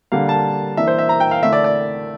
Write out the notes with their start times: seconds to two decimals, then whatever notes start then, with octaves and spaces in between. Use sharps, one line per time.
0.12 D3 G3 A#3 D4 F5
0.29 A5
0.77 E3 A#3 D4 E5
0.87 C5
0.99 E5
1.09 A#5
1.20 G5
1.31 F5
1.42 D3 A3 E4 E5
1.53 D5
1.64 D5